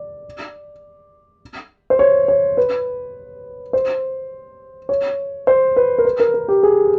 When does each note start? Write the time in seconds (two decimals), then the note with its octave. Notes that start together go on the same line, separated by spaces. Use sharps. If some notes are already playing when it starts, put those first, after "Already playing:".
Already playing: D5
1.90 C5
1.99 C#5
2.28 C#5
2.57 B4
3.73 C5
4.89 C#5
5.47 C5
5.76 B4
5.98 A#4
6.05 B4
6.20 A#4
6.34 A#4
6.48 G4
6.63 G#4